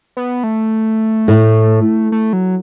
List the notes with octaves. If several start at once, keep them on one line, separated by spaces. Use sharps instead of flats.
B3
A3
A2
A3
F#3